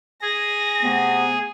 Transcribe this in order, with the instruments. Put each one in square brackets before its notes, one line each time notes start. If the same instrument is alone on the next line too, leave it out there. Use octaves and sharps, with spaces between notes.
[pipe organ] G#4 [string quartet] A#6
[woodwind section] C3 A3 B3